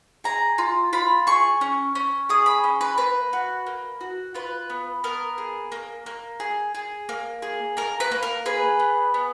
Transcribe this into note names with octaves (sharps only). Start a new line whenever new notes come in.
G#4 A#5
F4
F4 B5
G#4 C#6
C#4
C#4
G#4 D#6
B5
C#4
B4
A#3 B4
F#4
A#3
F#4
F4 B4
B3
B3 A#4
G#4
A#3
A#3
G#4
G#4
A#3
G#4
A#3 A#4
B4
A#3
A#4
G#4 B4
B3
B3